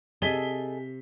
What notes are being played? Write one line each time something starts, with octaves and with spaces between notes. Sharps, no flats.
C3 G#4 A4 D#5 B6 G7